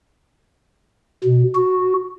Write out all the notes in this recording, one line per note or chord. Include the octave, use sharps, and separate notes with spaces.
B2
F#4